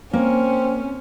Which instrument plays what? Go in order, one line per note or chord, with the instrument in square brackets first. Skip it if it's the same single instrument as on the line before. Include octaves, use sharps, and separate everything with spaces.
[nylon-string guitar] A#3 [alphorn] C4 [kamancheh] C#4